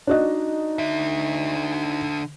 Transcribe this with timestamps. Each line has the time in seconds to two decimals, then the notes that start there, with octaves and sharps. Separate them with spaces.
0.07 D4 D#4 F#4 D#5
0.79 D3 E5